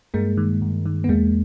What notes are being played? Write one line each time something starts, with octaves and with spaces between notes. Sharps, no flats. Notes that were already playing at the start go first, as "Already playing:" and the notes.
G2 G#3 A#3
D#3
G2
D#3
B3
E2 G#3 A#3